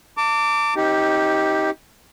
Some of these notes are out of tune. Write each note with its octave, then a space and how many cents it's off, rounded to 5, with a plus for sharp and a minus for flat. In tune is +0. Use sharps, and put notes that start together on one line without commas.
A5 +40 D6 -10
C4 +45 D#4 +20 G4 -5